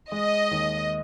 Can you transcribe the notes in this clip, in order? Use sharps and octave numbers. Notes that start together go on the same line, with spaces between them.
G#3 D#5
D#2